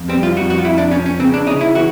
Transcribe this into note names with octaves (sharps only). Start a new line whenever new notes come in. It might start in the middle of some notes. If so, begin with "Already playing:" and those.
Already playing: F2
G3 C4
F4
F2 F#4
F#4
F4
F2 E4
D4
F3 C#4
C#4
C#3 C4
D4
C#3 D#4
E4
E3 F#4